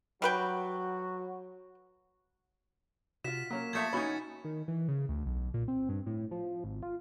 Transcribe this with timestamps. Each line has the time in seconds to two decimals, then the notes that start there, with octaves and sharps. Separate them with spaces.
0.22 F#3 G3 F#4 B4 G5
3.24 C3 F4 F#4 B6 E7
3.51 F#3 A#3 C#4 A#4
3.73 F3 A3 E5 G#6 A6 C#7
3.93 E3 C#4 D#4 F#4 B5
4.44 D#3
4.68 E3
4.88 C#3
5.09 D2
5.26 B1
5.54 A#2
5.68 C4
5.89 G2
6.06 A2
6.31 F3
6.64 G#1
6.83 F4